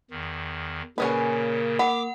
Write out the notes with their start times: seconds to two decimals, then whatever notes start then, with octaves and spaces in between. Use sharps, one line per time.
0.11 E2 D#3
0.98 A#2 C#3 A#3 C#4 G#4 B4
1.79 F#5 B5 D6